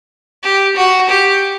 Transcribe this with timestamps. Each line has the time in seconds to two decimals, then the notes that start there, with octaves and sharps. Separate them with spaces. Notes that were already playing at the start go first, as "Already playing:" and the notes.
0.43 G4
0.76 F#4
1.09 G4